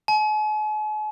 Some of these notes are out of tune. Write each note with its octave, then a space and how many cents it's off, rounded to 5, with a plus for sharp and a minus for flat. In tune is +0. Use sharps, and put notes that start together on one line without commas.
G#5 +45